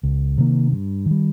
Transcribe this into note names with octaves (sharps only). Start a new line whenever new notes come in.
C#2
C3 D#3 A#3
G2
D#3 G3